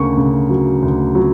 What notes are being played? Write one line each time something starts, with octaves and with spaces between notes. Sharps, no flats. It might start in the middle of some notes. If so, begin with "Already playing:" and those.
Already playing: D2 C#3 A#3 C#6
C#3
F#3
D2
F#3